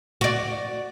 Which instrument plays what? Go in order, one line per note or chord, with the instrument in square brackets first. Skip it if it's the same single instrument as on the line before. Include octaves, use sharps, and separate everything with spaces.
[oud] F#4 D5